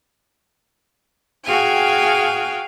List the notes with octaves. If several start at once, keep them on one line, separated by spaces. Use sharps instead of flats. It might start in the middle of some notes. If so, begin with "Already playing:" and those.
F#4 G#4 F5 G5 G#5